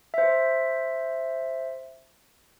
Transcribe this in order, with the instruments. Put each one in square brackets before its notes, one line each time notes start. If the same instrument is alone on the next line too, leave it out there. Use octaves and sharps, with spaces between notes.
[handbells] C5 E5